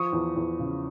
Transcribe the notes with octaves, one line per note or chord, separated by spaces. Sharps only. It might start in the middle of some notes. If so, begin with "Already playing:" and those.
Already playing: F3 C#6 D#6
E2
E2
C#3